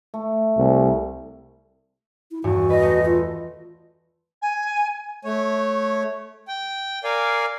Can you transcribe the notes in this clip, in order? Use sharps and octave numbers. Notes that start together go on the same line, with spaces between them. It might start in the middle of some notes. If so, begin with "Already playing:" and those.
A3
C2
E4
D#1 E2 G2 F#4
B4 D#5
A3
F4
G#5
A3 C#5
G5
A#4 D5 F5 G#5